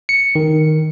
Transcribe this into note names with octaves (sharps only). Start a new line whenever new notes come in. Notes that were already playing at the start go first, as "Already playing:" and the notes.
C#7
D#3